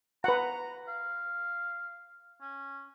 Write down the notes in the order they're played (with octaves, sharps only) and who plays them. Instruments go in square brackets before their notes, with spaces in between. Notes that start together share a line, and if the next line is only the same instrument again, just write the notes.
[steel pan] B4 F#5 [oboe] A#5
[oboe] F5
C#4